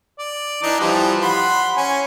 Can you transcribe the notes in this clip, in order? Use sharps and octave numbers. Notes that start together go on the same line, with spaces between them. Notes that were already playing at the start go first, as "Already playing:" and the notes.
D5
E3 D4 D#4
E3 F3 G3
F#5 B5 C6
C#4 G#5